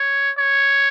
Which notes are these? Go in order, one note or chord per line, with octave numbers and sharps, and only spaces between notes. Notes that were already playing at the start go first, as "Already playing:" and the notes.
Already playing: C#5
C#5